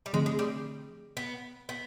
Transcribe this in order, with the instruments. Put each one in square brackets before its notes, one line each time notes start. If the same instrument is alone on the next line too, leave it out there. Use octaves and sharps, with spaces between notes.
[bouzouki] G3
[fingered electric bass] D3 F3 A3 C4 [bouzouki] G#3
[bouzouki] G#3
G3
B3
B3